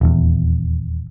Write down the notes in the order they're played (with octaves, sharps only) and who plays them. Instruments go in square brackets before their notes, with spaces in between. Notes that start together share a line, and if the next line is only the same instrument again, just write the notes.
[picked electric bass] D#1 E2